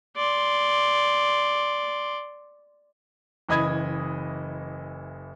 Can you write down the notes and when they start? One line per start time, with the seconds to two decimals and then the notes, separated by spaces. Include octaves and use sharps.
0.17 D5 C6
3.49 F#1 E3 D#5 B5 D#6 G#6